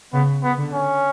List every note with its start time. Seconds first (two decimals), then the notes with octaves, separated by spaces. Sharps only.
0.13 C#3 B3
0.43 B3
0.58 D3
0.73 C#4